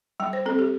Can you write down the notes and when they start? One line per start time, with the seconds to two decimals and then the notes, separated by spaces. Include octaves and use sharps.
0.20 G3 G5
0.33 C5
0.46 C4 A4
0.59 G4